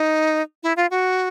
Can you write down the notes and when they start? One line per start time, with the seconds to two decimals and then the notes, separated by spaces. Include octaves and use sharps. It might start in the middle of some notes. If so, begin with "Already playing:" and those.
Already playing: D#4
0.63 E4
0.77 F4
0.91 F#4